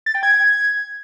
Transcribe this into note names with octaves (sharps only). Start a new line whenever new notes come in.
A6
G5
G#6